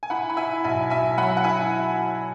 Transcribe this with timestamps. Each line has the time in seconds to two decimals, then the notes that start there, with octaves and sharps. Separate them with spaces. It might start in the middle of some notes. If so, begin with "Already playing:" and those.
0.03 G#5
0.10 E4 F#5 B5
0.30 B5
0.37 E4 E5 G#5
0.64 B1 E5 G#5
0.90 B1 E5 G#5
1.18 F#3 F#5 B5
1.37 F#5
1.44 E4 E5 G#5